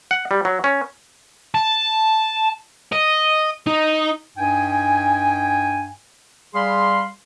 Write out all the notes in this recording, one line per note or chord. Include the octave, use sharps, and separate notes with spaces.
F#5
G3
F#3
C#4
A5
D#5
D#4
G2 D#4 G5 G#5
G3 G#4 F5 B5 C6